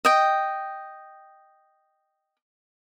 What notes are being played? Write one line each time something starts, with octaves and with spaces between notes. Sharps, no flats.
D#5 G5